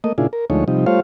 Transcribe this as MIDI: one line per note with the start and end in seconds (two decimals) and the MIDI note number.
0.04 0.13 57
0.04 0.13 58
0.04 0.13 75
0.18 0.27 46
0.18 0.27 49
0.18 0.27 62
0.18 0.27 64
0.18 0.27 65
0.18 0.27 68
0.33 0.45 70
0.50 0.64 38
0.50 0.64 53
0.50 0.64 56
0.50 0.64 57
0.50 0.64 63
0.50 0.64 73
0.68 0.85 48
0.68 0.85 53
0.68 0.85 55
0.68 0.85 63
0.86 1.00 55
0.86 1.00 57
0.86 1.00 65
0.86 1.00 72
0.86 1.00 73
0.86 1.00 77